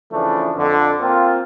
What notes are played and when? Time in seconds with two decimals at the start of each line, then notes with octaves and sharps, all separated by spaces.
0.12 C#3 E3 F3 A3 D4
0.56 F2 D3
1.00 A#3 C4 F4